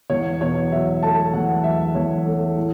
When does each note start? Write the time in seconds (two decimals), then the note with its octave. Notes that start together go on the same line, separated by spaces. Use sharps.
0.10 E2 C#5
0.41 B2 C#5
0.71 F#3 E5
1.02 A3 A5
1.33 E2 F#5
1.64 F#3 E5
1.95 E2 C#5
2.26 A3
2.56 A2